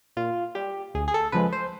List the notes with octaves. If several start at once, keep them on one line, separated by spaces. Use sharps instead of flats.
A#2 F4
G3 G4
D2 G#4
G#4
A4
C#3 F3 G#3 B4
C5